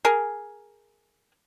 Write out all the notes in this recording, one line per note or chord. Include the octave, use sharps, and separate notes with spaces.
G#4 A#4